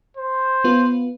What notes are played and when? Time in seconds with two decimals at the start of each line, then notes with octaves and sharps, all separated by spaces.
0.17 C5
0.64 B3 F4 B4